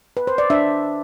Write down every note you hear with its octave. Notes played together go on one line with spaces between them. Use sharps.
B4
C5
D5
D4 E5